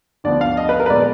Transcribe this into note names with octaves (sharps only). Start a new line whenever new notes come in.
D2 D3 F3 B3 D5
F5
D#5
B4
A#4
B4
A#2 F3 G#3 B3 D5